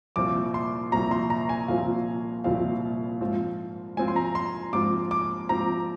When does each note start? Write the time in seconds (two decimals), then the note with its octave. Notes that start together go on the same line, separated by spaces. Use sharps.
0.16 C2 A#2 F3 C4 F4 D6
0.54 C6
0.92 C2 A#2 F3 C4 F4 A#5
1.11 C6
1.30 A#5
1.49 G#5
1.68 C2 A#2 F3 C4 F4 F5
2.44 C2 A#2 F3 C4 F4 F5
3.21 G#2 F3 C4 F4
3.97 G#2 F3 C4 F4 G#5
4.08 C6
4.16 A#5
4.35 C6
4.73 G#2 F3 C4 F4 D6
5.11 D6
5.49 G#2 F3 C4 F4 A#5